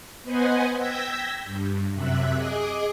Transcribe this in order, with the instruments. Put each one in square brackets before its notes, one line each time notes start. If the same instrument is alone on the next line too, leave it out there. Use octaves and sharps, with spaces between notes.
[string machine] B3 B4 C5 D#5 F#5 G#5
G5 E6 G6 G#6 A#6 B6
G2
F#2 C3 E5 F#6
G#4 D#5 D6